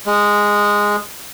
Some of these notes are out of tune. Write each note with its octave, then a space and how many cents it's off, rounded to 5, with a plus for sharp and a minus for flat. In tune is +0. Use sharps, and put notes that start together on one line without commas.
G#3 -10